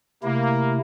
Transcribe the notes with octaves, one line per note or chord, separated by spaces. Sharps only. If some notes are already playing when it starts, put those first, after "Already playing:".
C3 A3 A#3 E4